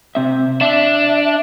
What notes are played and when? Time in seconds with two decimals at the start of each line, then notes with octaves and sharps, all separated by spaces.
0.15 C3 C4 E5
0.61 D4 E5